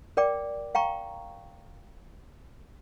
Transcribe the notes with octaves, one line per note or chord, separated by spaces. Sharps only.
A#4 D5 G5 D6
F5 G5 A#5 C#6